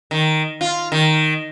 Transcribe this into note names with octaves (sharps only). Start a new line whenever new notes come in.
D#3
F4
D#3